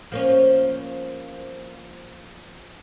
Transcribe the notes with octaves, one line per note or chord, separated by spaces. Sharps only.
F3 A#3 C#4